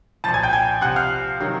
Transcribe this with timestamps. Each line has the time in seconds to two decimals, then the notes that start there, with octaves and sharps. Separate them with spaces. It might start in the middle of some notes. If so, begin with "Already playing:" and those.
0.24 F3 A5 A6
0.28 A#2
0.34 G#5 G#6
0.43 G5 G6
0.53 G#5 G#6
0.81 C3 F#5 F#6
0.85 F3
0.96 F5 F6
1.40 C3 D#3 F#3